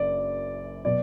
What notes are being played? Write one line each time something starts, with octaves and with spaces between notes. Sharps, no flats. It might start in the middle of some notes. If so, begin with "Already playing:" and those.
Already playing: F#1 F#2 D5
B2 F#3 D5